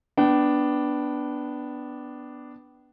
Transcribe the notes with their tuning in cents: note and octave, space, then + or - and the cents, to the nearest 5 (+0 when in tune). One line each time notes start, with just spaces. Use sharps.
B3 +0 D4 +0 G5 -40